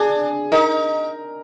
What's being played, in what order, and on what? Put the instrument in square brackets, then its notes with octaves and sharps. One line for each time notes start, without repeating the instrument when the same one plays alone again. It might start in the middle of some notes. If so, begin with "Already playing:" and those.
Already playing: [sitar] D4 [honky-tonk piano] G#4
[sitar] D#4 [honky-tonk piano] A#4